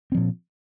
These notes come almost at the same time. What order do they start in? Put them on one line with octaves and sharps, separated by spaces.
C4 F3 A#2